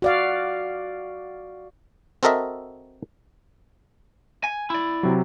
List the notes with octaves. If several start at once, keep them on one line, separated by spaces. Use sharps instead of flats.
F#4 D5 F5
C4 F#4 A4 A#4 D#5 E5
G#5
E4 D5
C3 F#3